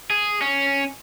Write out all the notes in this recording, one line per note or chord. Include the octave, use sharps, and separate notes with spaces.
G#4
C#4